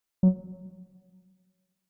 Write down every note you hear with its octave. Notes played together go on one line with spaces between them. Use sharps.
F#3